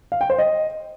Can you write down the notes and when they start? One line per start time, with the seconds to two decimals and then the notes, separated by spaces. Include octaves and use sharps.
0.12 F5
0.21 G5
0.30 C5
0.39 D#5